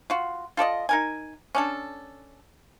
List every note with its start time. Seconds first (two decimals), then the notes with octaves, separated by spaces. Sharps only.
0.10 F4 F#4
0.57 F4 A4 D5 D#5
0.89 D#4 A#4 G#5
1.55 C#4 D4 A4